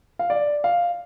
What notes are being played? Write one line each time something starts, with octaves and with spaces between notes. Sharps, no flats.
F5
D5
F5